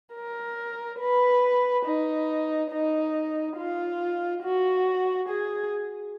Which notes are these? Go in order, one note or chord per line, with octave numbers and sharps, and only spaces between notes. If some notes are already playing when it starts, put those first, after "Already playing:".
A#4
B4
D#4
D#4
F4
F#4
G#4